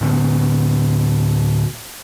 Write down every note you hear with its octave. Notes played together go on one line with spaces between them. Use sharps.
A2 D3 B3